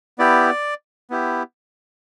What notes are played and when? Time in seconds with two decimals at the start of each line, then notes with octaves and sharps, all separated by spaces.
0.19 B3 E4 G4 D5
1.10 B3 E4 G4